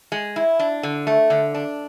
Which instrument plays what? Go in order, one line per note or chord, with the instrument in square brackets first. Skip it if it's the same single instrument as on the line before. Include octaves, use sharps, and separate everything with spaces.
[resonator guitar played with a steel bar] G#3
E4
D4
D3
A3
D3
D4